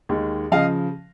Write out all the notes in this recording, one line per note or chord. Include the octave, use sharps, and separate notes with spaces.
D#2 D#3 G#3
C#3 F3 D#5 F5